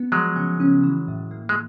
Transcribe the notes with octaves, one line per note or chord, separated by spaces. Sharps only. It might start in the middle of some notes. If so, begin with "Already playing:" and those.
Already playing: B3
F3 F#3 G#3
C#3
C#4
E3
A2
A#3
G#3